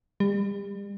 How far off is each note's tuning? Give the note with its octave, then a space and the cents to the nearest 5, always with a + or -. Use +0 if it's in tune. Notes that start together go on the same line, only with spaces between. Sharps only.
G3 +35